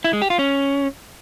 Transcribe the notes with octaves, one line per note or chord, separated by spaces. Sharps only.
E4
G#3
G4
F4
C#4